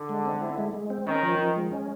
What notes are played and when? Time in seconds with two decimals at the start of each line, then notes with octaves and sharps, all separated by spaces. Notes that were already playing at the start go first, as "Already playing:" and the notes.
Already playing: D3
0.09 G#3
0.25 C4
0.41 E4
0.58 G#3
0.74 G#3
0.90 C4
1.06 D#3 C#4
1.23 F3
1.39 F3
1.56 G#3
1.71 C#4